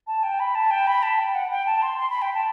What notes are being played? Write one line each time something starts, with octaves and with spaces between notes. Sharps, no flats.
A5
G5
B5
A5
G5
B5
A5
G5
F#5
G5
A5
C6
C6
B5
G5
A5